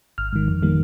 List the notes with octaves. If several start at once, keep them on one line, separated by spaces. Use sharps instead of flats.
G#1 F6
G#2 D#3
F2
D#3 G3 A#3